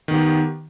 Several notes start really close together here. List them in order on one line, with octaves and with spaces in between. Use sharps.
D#3 B3 G4